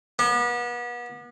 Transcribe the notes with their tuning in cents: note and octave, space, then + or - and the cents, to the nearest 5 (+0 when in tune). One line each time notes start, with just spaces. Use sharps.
B3 -35